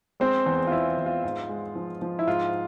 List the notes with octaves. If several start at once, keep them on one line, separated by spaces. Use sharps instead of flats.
G#3 C4 C5
E2
F4
E2 E4
E2
F4
G#2
G#3
F3
F3
E4
G#2 F4